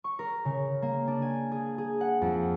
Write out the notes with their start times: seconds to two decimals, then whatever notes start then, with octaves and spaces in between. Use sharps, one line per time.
0.04 C#6
0.19 A#4
0.45 C#3
0.82 A#3
1.08 D4
1.22 G#5
1.52 G#4
1.78 G#4
2.01 F#5
2.22 F2